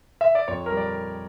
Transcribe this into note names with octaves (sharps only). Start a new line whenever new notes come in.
E5
D5
F2 C#5
G3 A#4
D5